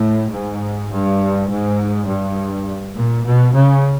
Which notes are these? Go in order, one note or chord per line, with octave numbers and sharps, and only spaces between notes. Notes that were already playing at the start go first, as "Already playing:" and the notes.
Already playing: A2
G#2
G2
G#2
G2
A#2
B2
C#3